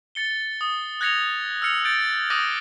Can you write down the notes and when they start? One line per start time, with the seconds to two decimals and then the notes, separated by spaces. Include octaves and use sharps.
0.15 A6 C#7 G7
0.61 D#6
1.01 F#6 G#6 A#6 C#7 F7
1.62 E6 F6 C#7 F7
1.84 G6 A6 D7
2.30 D6 D#6 F6 F#6 A#6 D#7